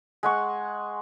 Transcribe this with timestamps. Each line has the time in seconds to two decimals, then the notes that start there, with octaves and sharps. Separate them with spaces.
0.23 G#3 F#5 C#6